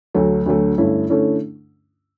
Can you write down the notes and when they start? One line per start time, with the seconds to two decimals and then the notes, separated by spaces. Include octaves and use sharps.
0.15 D2 D3 F#3 A3
0.46 D2 D3 F#3 A3
0.78 G2 D3 A3 C#4 E4
1.10 D3 A3 C#4 E4